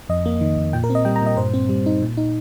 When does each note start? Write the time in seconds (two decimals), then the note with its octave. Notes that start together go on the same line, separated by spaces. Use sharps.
0.09 F2 D#5
0.26 A#3
0.41 D#3
0.57 F2
0.73 A#2 G5
0.84 A#4
0.90 C4
0.95 D#5
1.05 G3 G5
1.16 A#5
1.22 A#2 D#5
1.37 G2 C5
1.54 C4
1.69 G3
1.86 D#4
2.02 A#2
2.17 D#4